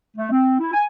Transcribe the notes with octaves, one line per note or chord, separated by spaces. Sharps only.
A3
C4
E4
G#5